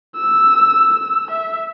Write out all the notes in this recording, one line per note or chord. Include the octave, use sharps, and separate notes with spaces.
E6
E6
E5